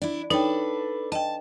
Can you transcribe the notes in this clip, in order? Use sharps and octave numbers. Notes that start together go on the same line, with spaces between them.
D4 E4
D4 D#4 A4 B4 C#5 G5
D#5 G5 A5